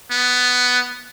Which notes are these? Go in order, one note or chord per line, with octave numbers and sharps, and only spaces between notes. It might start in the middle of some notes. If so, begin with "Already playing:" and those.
B3